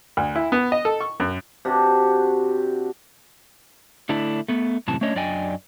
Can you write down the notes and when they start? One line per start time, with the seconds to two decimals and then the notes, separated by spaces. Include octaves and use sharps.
0.17 D2
0.36 E4
0.52 B3
0.72 D#5
0.85 A4
1.01 C#6
1.20 F#2
1.65 C3 D4 F#4
4.09 D3 A3 D4 E4
4.48 A3 B3
4.88 F#2 A2 C3 E3 A5
5.01 A3 C#4 D4 C#5 D#5
5.15 F#2 D4 D5 D#5 G5 G#5